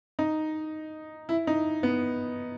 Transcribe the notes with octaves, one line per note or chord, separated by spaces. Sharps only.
D#4
E4
D#4
B3